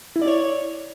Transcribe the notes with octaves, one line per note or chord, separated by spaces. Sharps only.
E4
D5
C#5